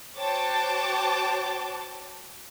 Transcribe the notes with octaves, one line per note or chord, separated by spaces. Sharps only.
F#4 C5 C#5 G5 A5 D6